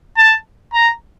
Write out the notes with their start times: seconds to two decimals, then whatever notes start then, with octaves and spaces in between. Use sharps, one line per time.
0.17 A5
0.73 A#5